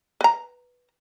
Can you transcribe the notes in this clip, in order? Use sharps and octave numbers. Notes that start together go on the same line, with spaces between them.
B4 A#5